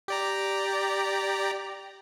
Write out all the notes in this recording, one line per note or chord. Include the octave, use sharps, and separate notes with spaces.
G4 D5 A#5